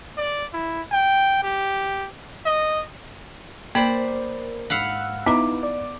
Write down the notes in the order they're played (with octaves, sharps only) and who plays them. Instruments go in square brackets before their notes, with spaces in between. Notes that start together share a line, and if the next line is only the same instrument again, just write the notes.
[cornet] D5
E4
G5
G4
D#5
[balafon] A#3 [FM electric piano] A#4 [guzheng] C5 D5 B5
[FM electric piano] G#2 E6 F#6 [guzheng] F5 F#5 B5
[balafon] B3 A#5 [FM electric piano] D#4 E4 B4 [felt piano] D6
[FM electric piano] D5